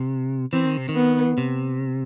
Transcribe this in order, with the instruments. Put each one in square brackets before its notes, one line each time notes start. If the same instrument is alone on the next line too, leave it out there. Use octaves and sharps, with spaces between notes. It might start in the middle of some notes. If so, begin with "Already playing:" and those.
Already playing: [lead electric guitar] C3
[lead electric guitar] E3 [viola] C4
[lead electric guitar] D#3
C3
D#3
[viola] B3
[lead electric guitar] C3